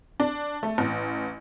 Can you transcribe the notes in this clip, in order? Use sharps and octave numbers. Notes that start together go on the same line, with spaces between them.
D4
A3
A1